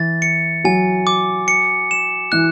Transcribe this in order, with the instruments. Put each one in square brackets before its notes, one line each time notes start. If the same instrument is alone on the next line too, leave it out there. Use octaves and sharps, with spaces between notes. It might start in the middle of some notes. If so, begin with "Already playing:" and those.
Already playing: [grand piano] E3 [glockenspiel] A6
[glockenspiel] C#7
[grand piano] F#3 [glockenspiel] G#5
[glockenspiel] D6
C#7
E7
[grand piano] E3 [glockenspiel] F#6